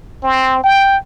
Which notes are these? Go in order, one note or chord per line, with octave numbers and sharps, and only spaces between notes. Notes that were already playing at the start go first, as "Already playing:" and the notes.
C4
G5